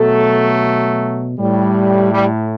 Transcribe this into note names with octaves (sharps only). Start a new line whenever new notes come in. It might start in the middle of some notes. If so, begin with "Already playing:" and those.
Already playing: B2 F#3 A3 A4
A2 G3
G3 G4